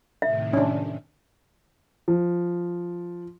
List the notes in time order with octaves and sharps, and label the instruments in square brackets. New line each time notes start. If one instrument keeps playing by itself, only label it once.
[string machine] A2 C3 D#3 [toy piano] E5
[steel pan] C#4 D4
[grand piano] F3